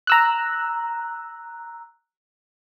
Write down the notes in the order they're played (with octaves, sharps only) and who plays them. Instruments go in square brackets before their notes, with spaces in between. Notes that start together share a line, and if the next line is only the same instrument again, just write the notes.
[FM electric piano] A#5 E6 F#6